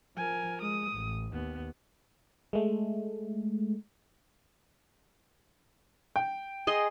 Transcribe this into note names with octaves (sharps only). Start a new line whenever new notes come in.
F3 A#4 G#5
G#3 D#6
A1
D#2 B3
G#3 A3
G5
G#4 D#5 C6